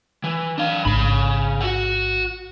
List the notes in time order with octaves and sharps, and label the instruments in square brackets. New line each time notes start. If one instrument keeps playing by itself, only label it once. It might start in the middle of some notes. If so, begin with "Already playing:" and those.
[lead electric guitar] E3
D4 F5
[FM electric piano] A1 G#2 [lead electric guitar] C#3 B5
[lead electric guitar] F#4 F#5